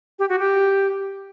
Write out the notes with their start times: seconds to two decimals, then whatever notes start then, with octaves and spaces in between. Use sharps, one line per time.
0.19 G4
0.29 F#4
0.39 G4